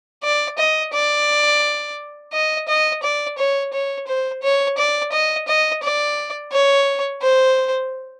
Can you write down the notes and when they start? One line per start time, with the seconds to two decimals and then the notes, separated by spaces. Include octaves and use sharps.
0.24 D5
0.58 D#5
0.93 D5
2.33 D#5
2.68 D#5
3.03 D5
3.38 C#5
3.73 C#5
4.07 C5
4.43 C#5
4.78 D5
5.13 D#5
5.48 D#5
5.83 D5
6.52 C#5
7.22 C5